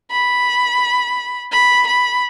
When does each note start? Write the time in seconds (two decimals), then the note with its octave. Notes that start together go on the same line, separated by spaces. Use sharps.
0.11 B5
1.52 B5
1.87 B5